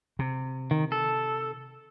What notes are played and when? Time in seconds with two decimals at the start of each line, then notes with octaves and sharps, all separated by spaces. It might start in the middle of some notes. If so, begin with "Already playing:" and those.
0.19 C3
0.71 D#3
0.92 A4